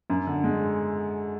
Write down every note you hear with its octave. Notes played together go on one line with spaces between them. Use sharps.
F#2
D3
G#3